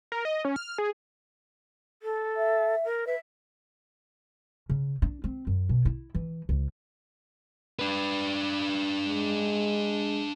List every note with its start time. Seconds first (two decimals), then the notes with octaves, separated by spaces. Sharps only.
0.12 A#4
0.25 D#5
0.45 C#4
0.56 F6
0.78 G#4
2.02 A4
2.37 E5
2.84 A#4
3.06 B4 E5
4.69 C#3
5.02 D4
5.24 C4
5.47 F#2
5.69 B2
5.85 E4
6.15 E3
6.49 C#2
7.79 D4 B4
9.02 G#3